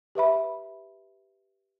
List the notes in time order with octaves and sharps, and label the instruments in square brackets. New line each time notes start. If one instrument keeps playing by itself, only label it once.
[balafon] G4 B4 E5 B5